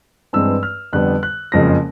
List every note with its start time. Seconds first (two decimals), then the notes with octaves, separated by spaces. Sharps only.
0.33 G2 E3 G#3 C4 E6
0.63 F6
0.93 F2 D3 G3 B3 F#6
1.23 F#6
1.52 F#1 F2 C#3 F3 G#3 A#6